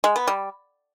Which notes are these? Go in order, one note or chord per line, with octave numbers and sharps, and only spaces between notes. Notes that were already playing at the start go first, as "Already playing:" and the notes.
G#3
B3
G3